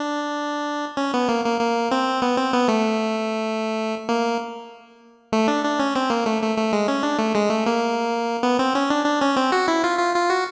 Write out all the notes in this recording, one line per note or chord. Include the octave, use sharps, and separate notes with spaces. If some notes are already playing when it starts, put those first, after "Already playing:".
Already playing: D4
C#4
B3
A#3
A#3
A#3
C4
B3
C4
B3
A3
A#3
A3
D4
D4
C#4
C4
A#3
A3
A3
A3
G#3
C#4
D4
A3
G#3
A3
A#3
B3
C4
C#4
D4
D4
C#4
C4
F#4
E4
F4
F4
F4
F#4